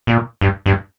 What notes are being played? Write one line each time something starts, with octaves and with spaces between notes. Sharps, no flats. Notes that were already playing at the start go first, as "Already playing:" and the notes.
A#2
G2
G2